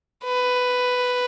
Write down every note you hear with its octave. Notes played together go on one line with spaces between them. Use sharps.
B4